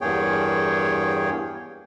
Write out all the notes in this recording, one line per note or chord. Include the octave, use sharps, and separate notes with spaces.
E2 G2 A#3 G#4 C#5 G5